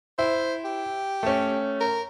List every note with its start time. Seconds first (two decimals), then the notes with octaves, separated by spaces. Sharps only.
0.19 E4 C5
0.64 G4
1.23 A3 C#4
1.80 A#4